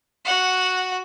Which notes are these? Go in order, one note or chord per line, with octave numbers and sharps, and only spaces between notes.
F#4 F#5